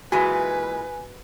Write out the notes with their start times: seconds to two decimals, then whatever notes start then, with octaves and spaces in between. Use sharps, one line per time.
0.12 A#2 E3 G#3 F#4 B4 G#5